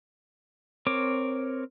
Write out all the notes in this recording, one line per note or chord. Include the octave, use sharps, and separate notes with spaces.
C4 A#4 C#5 D6